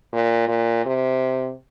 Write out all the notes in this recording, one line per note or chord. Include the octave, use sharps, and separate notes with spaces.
A#2
A#2
C3